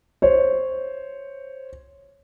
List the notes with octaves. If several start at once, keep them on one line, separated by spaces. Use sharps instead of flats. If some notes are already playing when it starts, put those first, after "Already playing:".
C5 C#5